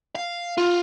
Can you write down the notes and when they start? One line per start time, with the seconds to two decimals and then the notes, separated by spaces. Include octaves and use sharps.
0.15 F5
0.57 F4